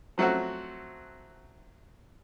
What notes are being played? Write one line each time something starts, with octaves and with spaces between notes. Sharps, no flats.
F3 F#3 A3 C4 F#4